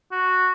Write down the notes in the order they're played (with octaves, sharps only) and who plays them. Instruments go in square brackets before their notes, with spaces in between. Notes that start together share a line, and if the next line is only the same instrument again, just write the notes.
[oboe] F#4